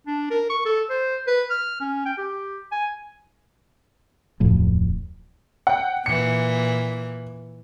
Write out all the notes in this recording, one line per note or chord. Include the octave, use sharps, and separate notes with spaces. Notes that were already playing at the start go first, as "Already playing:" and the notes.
D4
A#4
C#6
A4
C5
B4
F6
C#4
G5
G4
G#5
D1 F2 A2
F#5 G5
A#2 E3 C#7